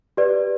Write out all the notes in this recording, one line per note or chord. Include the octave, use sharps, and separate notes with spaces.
G4 B4 D5